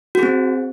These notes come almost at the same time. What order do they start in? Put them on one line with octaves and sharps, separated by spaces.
F#4 G#4 C4